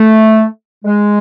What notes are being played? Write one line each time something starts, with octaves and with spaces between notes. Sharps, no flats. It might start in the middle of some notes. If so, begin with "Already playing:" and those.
Already playing: A3
G#3